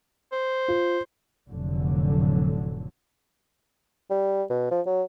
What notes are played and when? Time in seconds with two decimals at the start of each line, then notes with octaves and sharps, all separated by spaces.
0.32 C5
0.68 F4
1.49 F1 A2 D3 F#3
4.10 G3
4.50 B2
4.71 F3
4.86 F#3